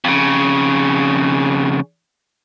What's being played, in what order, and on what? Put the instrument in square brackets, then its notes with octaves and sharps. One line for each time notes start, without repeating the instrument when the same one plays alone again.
[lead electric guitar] F2 C#3